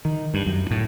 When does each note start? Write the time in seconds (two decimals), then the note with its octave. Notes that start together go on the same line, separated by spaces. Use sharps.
0.05 D#3
0.34 G2
0.46 F#2
0.71 A2